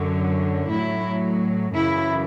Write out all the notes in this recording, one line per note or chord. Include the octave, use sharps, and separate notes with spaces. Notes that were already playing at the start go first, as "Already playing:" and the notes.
Already playing: F#2 D3 F#3
A2 F#3 E4
F#2 C#3 E3 E4